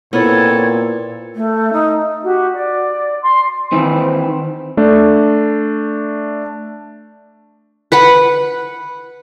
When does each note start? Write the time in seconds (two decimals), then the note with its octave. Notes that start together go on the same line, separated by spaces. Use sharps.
0.13 A#2 B3 C4 E4 F4 A4 C#5
1.35 A3
1.72 D#4
2.24 F#4 G4
2.54 D5
3.22 C6
3.72 D#3 E3 C4
4.77 A3 D4
7.92 B4 F#5 B5